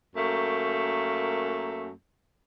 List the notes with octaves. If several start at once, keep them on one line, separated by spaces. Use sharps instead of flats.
F#2 A3 A#3